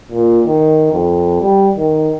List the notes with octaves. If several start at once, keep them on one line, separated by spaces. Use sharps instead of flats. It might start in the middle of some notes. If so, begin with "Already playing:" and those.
A#2
D#3
F2
G3
D#3